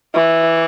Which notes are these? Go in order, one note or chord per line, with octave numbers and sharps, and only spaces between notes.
E3